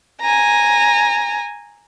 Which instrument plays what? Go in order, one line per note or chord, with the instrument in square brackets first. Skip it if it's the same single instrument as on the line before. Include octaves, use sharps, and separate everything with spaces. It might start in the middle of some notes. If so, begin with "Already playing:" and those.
[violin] G#5 A#5